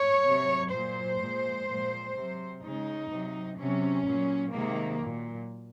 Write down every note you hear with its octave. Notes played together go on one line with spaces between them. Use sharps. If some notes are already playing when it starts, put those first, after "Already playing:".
Already playing: C#5
C3 F#3
A#2 F#3 C5
A#2 F3 G#3
A#2 F3 G#3
C3 F#3
C#3 G#3 D#4
C3 F#3
C3 F#3 C#4
A#2 F#3
C3 D#3 G#3 A#3
A#2 F#3